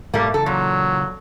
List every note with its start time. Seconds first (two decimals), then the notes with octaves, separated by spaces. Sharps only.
0.14 G#2 B2 G3 A3 A#3
0.34 C#3 E3 A4
0.46 A#2 F#3